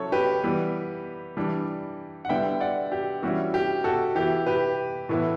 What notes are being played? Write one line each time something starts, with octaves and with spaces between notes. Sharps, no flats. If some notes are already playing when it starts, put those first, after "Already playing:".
Already playing: F#3 C#4 E4 A4 C#5
G4 B4
E3 G3 B3
E3 G3 D4
F#5
D3 G3 B3 E4 E5 G5
D5 F#5
G4
E3 G3 C#4 E4 F#4
G4
F#4 A4
E3 B3 E4 G4
G4 B4
A2 E3 B3 E4